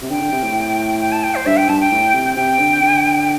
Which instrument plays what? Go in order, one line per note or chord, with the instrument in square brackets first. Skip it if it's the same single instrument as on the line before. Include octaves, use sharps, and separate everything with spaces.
[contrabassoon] C3
[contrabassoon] D3 [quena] G5
[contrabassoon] D3
C3
A2
[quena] G5
A5
G5
C5
[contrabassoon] G2 [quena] E5
[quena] G5
[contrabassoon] G2 [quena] A5
[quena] G5
[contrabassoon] A2
C3
[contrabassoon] C3 [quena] G5
[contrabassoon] D3
D3